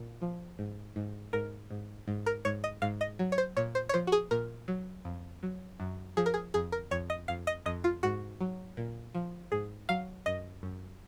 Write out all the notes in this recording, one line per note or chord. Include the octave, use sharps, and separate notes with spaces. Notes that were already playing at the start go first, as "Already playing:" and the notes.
Already playing: A#2
F3
G#2
G#2
G#2 A#4
G#2
G#2
A#4
G#2 C#5
D#5
G#2 F5
D#5
F#3
C#5
C5
A#2 C#5
C5
C#5
F3 C5
F#4
G#4
A#2 A#4
F#3
F2
F#3
F#2
F3 G#4
A#4
G#4
F2 G#4
A#4
F2 C#5
D#5
F2 F5
D#5
F2 D#5
F4
G#2 F#4
F#3
A#2
F3
G#2 G#4
F#3 F5
F#2 D#5
F#2